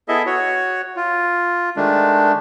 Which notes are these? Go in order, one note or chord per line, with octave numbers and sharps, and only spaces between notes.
B3 E4 G#4 A4 D#5 E5
F#4 C#5
F4
D#3 G#3 A3 D4